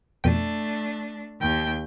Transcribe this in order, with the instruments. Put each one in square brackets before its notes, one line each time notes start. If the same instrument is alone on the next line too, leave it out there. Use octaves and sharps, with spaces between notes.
[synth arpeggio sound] F2 B2 G5 [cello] A3 D4
[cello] D#2 G5